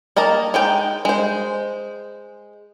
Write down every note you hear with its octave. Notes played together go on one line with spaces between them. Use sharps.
A#3 D#5 A5 A#5
G#3 D#4 G5
G#3 C5